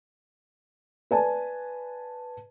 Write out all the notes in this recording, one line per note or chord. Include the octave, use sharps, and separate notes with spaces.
B4 D5 G#5 A5